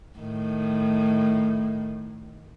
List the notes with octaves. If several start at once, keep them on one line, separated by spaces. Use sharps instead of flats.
A2 D#3